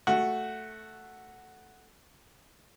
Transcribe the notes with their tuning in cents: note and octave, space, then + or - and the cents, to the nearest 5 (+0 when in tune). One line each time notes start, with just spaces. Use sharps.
A3 +0 F#4 +0